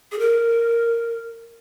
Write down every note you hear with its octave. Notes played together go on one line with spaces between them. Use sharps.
G#4
A#4